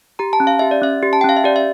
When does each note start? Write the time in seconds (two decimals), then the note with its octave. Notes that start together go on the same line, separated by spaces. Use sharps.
0.19 G4 A#5
0.33 A5
0.40 C#4
0.47 F5
0.59 G4 E5
0.71 D5
0.82 C#4 E5
1.03 G4
1.13 A5
1.21 G5
1.24 C#4 F5
1.36 E5
1.44 G4 D5
1.56 E5